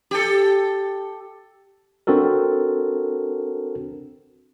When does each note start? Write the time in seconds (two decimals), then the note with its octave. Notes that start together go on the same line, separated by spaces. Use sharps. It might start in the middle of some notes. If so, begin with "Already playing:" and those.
0.11 G4 A4
2.07 C4 D4 F#4 A4 A#4